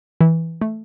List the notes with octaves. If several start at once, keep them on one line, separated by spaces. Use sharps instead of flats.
E3
A3